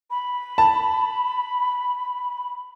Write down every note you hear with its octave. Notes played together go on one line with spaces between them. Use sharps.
B5
A5